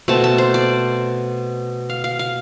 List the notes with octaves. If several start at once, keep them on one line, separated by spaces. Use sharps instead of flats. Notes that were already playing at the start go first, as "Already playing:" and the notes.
B2 A3 C4 A5
A5
C5
D5
F5
F5
F5